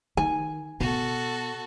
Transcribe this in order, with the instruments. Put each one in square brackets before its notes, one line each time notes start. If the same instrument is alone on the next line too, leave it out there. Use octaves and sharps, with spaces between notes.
[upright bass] D#3 [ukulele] G#5
[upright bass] B2 [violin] F#4 A4